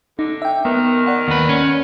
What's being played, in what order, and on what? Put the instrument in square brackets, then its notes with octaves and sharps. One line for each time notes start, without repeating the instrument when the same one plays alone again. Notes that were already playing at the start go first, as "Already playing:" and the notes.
[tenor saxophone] D3 [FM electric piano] D#4
[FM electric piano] E5 G5
[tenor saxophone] D#3 [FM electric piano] B3
[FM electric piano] D5 F#5
[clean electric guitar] D#2 B4
C#4